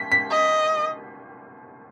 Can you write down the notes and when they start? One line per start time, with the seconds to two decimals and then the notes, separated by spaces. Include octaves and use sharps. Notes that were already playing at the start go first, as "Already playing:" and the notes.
Already playing: B6
0.12 B6
0.31 D#5